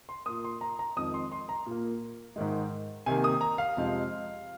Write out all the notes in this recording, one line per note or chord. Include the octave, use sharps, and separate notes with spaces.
C6
A#2 A#3 D#6
C6
A#5
A#5
F2 D#3 G#3 C4 D#6
C6
C6
A#5
A#2 A#3
G#2 D#3 G#3
C3 D#3 A#3 G#5
D#6
A#5
F5
F2 C3 G#3 C4